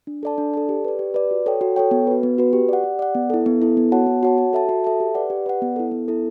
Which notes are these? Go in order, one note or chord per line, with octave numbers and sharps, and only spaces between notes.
D4
A4 D5 A5
D4
A4 D5 A5
G4
B4 D5
G4
B4 D5
F#4
A4 C#5 G5
F#4
A4 C#5 G5
B3
F#4 B4
B3
F#4 B4
G4
D5 F#5
G4
D5 F#5
B3
E4 A4
B3
E4 A4
B3
F#4 C#5 F#5 A5
B3
F#4 C#5 F#5 A5
F#4
A4 E5 A5
F#4
A4 E5 A5
G4
B4 D5 F#5
G4
B4 D5 F#5
B3
E4 A4
B3
E4 A4